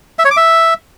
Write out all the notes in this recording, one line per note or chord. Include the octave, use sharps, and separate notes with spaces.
E5
C#5
D6
E5